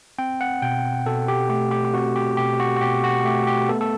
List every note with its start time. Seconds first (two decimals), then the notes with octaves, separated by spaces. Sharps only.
0.19 C4 G5
0.41 F#5
0.62 B2 G5
1.06 B2 A4
1.28 G4
1.49 A3 G4
1.71 G4
1.85 G4
1.94 C4 F#4
2.16 G4
2.37 B2 G4
2.60 F#4
2.77 F#4
2.81 B2 G4
3.04 F#4
3.25 A3 G4
3.47 G4
3.69 B3 A4
3.81 A4